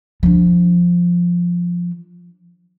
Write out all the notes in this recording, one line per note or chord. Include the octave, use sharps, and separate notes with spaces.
F3 D4